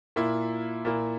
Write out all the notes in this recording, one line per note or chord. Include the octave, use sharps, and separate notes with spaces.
A#2 A#3 E4
A#2 A#3 E4